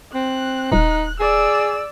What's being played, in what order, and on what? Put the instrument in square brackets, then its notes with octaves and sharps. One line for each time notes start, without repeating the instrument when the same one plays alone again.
[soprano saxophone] C4 [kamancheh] F#6
[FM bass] D#1 [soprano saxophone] D#4
[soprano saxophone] G#4 [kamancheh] D5 E6